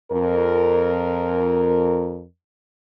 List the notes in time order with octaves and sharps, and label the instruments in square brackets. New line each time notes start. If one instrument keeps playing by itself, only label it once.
[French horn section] F2 A#4